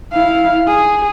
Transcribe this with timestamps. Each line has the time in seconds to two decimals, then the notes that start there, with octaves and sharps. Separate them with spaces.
0.13 E4 F5
0.67 G#4